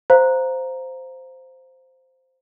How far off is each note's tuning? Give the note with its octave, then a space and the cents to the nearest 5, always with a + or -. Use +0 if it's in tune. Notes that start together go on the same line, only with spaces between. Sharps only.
C5 -5 F5 +0 A#5 +0